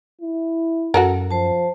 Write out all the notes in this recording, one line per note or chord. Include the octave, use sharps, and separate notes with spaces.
E4
F#2 F#4 A4 A#4
F3 C5 A5